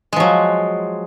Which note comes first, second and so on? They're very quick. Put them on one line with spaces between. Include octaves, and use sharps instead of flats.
G#3 F3 F#3